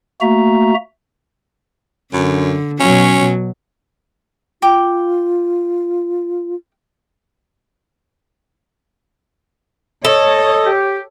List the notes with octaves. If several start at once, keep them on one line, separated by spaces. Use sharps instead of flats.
A3 A#3 F#4 E5 A#5
F#2 D3
B2 F#3 C#4
F4 G5 D6
A4 C#5 D#5
G4